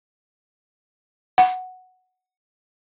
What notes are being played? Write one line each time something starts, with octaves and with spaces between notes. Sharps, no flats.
F#5